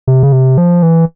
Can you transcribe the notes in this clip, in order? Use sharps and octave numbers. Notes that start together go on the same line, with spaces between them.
C3
C#3
C3
F3
E3